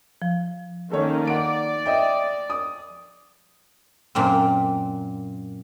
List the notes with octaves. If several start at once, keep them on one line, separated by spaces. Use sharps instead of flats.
F3
D#3 A#3 C#4 A4 C#5
D5 F#5 D7
D#5 E5 G5
D#6
F#2 A#2 A#3 C4